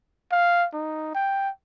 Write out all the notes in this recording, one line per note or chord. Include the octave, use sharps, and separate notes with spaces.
F5
D#4
G5